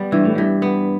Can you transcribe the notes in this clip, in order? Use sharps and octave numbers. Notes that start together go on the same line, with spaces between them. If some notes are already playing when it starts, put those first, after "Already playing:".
Already playing: G3 B3
G2 E3
A2
G2 E3
B3